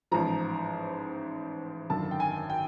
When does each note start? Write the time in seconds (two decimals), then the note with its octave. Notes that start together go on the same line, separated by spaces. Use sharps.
0.11 A1 G#2 F3 A#5
1.90 G#1 F#2 D3 A5
2.11 G5
2.20 G#5
2.50 G5